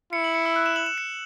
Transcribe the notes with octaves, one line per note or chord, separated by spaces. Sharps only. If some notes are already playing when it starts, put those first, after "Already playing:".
E4 C#7
F#7
C#7
E6
F#6
E7
F#7
E7
C#7